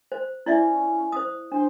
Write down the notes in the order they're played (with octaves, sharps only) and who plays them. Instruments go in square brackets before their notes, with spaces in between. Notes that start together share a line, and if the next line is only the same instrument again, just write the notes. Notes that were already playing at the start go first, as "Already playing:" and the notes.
[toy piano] C5
[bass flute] C#4 [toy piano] E4 D5 E5
[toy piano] C5 D#6
[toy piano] D4 [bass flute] C5